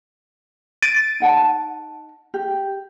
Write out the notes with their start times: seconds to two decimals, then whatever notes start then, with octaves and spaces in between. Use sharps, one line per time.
0.82 A6 D7 D#7
1.20 D#4 F#5 A5
2.34 G4